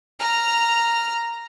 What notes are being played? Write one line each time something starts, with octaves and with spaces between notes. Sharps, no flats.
A#5 F6